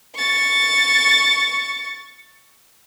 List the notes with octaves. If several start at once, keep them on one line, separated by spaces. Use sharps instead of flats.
C#6 A6